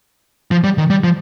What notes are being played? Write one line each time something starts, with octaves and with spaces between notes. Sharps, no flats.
F3
G3
D#3
G3
F3